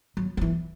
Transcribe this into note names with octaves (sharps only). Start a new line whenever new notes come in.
F#3
F#3
E3